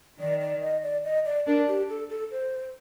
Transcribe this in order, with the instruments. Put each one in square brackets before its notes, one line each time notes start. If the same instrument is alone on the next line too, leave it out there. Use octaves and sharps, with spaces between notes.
[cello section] D#3 [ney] D5
[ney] D5
D#5
D5
D#5
D5
[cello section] D4 [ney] A#4
[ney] G4
A4
A4
C5